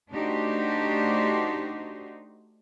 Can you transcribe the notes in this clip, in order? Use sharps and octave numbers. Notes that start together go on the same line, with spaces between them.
A3 D4 D#4 F#4 G4 C5